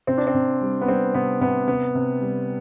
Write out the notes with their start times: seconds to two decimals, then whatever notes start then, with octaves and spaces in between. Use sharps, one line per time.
0.07 C3 C4
0.17 D4
0.27 C4
0.34 C3
0.61 G3
0.81 B3
0.88 G3 C4
1.14 C3 B3
1.41 C3 B3
1.67 C3 B3
1.95 C3
2.21 G3